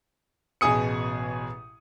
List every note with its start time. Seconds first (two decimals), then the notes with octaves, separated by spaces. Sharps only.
0.61 A1 B2 G#4 G#5 D#6 C#7